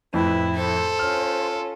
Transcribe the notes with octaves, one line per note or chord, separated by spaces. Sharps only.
F2 A2 F3 E4 B4
A4 C5
C#4 F4 F6